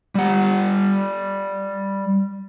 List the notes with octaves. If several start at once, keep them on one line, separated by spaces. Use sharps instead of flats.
G3 F#5